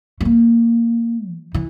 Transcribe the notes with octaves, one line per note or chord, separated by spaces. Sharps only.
A3
A#3
E3
E3